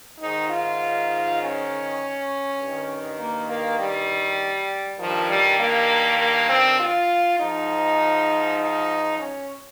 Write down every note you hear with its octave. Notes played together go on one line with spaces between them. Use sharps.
G#2 D#3 D#4
F4
C#4
G2 D#3
A#3
A#3
G3
G2 D#3 F3
G3
A#3
A#3
C4
F4
G#2 F3 D#4
D#4
C#4